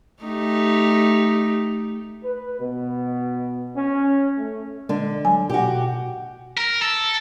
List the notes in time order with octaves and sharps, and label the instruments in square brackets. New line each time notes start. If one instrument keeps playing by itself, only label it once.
[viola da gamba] A3 D#4 G4
[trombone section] B4
B2
C#4
A3
[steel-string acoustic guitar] D3 [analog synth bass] G#3
[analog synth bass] F#3 [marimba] G#5
[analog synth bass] B2 [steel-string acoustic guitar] F#4 G4
[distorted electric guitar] A#4
A4